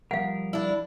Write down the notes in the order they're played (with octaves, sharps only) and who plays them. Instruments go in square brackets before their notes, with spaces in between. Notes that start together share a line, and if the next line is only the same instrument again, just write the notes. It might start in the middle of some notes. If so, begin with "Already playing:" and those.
[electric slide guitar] F3 G3 A#4 [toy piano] F5 F#5
[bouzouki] D4 E4